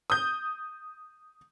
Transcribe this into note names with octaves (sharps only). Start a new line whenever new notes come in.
D#6 G6